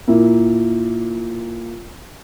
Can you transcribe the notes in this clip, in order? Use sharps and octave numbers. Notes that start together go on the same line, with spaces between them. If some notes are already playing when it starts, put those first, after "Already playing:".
A#2 A#3 E4